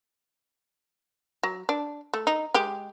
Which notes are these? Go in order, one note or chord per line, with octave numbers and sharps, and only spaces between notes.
F#3
D4
A3
D#4
G#3 G4